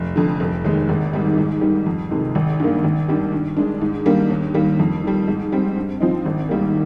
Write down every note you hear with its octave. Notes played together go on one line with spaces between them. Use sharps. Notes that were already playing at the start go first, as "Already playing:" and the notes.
Already playing: F1
F2 D3
F1
D#2 D#3 G#3
G#1
G#2 D#3 G3
G#2
D#3 G3
F2
C3 D#3 G#3
G#1
G2 D#3 A#3
G#1
G2 D#3 G3 D4
G2
D#3 G#3 D4
G#2
D#3 G3 A#3 D4
D#2
D#3 G3 A#3
F2
D#3 G3
G#2
G3 C4
G2
F3 C4 D#4
G#1
G#2 D#3 G3 A#3